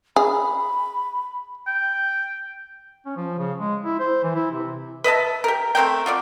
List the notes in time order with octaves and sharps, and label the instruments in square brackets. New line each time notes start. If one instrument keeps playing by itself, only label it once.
[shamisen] G#4 [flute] B5
[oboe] G5
[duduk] C#4
F3
C#3
G#3
E4
C5
E3
E4
C3
[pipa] B4 D#5 E5 A5
G4 A#4
A3 C4 A#4 G5
F4 F#4 D5